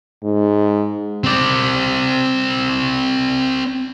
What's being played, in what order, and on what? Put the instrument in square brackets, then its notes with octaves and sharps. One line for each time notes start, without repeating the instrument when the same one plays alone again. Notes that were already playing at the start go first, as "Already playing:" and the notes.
[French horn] G#2
[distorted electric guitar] C4 D5